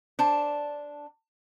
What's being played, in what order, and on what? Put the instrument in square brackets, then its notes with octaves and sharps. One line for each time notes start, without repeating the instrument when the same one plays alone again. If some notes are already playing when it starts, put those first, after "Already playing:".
[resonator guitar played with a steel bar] D4 C5 A5